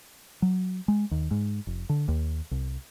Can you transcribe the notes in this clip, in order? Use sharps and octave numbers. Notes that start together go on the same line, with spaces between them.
F#3
G#3
D#2
G#2
F1
D3
D#2
C2